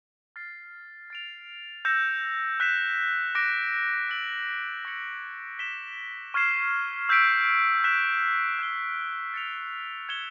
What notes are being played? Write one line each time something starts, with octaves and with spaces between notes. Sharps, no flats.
F6 A6 C7
A6 D7 F7
E6 G6 A#6 C#7 E7
F#6 B6 E7
D6 F#6 A#6 D7
E6 A6 D7 F#7
C#6 E6 G#6 C#7 F#7
F#6 B6 E7 G7
C#6 F6 G#6 C7 E7
E6 G6 B6 D7
F#6 B6 E7
E6 G6 C7 E7 G7
A6 C#7 F7
G#6 C#7 E7 G7